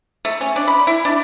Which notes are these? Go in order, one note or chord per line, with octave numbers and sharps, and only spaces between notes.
A3
C#4
D4
B5
E4
D4